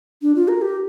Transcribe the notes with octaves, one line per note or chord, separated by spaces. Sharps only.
D4
F4
A#4
G4